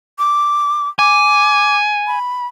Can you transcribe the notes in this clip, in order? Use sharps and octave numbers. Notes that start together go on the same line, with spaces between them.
D6
G#5 D6
B5